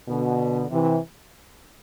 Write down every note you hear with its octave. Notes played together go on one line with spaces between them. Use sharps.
B2 D3
C3 E3